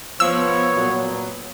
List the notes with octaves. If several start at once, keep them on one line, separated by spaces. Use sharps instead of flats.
F3 B3 C#5 E6
A#2 F#3